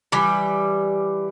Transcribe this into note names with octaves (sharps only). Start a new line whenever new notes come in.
E3 G3